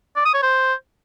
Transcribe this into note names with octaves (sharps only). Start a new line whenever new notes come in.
D5
D#6
C#5
C5